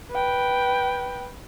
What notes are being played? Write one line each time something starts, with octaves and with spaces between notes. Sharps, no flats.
B4 G5